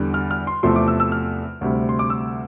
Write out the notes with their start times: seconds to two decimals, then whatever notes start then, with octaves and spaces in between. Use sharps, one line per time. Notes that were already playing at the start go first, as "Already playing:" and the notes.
Already playing: E2 D3 G3
0.14 F6
0.31 F6
0.47 C6
0.63 E2 C3 F3 A3 C6
0.76 D6
0.88 E6
1.00 E6
1.12 F6
1.61 D2 C3 G3
1.89 C6
1.99 D6
2.10 E6